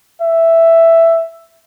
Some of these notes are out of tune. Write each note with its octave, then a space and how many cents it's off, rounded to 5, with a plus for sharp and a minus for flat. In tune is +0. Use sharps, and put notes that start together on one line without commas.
E5 +5